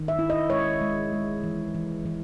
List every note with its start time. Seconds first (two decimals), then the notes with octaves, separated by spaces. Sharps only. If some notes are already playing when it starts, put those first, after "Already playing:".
Already playing: D#3
0.08 E5
0.19 E4
0.30 D#5
0.50 G#3 C#5
0.81 G#3
1.12 G#3
1.44 E3
1.75 E3
2.06 E3